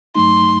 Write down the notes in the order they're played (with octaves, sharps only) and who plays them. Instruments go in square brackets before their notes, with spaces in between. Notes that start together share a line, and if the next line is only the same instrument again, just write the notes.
[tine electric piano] G2 F#3 A3 D#4 [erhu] C6